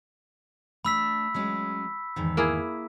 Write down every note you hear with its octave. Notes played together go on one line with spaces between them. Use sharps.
A3 D4 B5 E6 B6
F#3 G#3 C#4
E2 G#2 D#3
A#3 E4 G#4